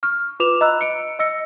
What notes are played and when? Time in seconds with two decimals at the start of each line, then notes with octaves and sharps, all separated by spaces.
0.03 C#6 F6
0.40 F4 B4 D6 E7 F7
0.61 D#5 A#5 B5 E6 F#6
0.81 C#7 D7
1.19 D#5 E6 A#6 C#7